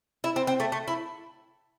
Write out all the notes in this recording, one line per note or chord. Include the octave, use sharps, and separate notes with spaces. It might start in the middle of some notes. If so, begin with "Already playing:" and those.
E4
C4
C4
A3
A3
E4